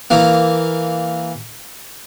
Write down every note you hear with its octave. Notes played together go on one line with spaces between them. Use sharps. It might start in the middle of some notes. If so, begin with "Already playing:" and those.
E3 A#3